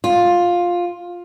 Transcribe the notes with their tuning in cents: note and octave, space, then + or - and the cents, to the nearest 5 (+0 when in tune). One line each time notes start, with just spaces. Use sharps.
F4 +10